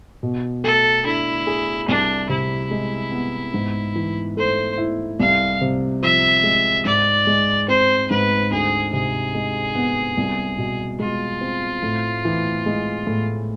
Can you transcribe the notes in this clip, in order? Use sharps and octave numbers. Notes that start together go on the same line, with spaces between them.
B2
A3 A4
D4 E4
G#4
C2 D4
C3 E4
G#3
B3
G#2
E3
A3 C5
E4
C2 F5
C3
F3 E5
G#3
G#2 D5
G#3
C4 C5
G#2 B4
D2 G#4
C3 G#4
G#3
B3
C2
B2
G#3 F4
C4
A2
E3
G#3
A2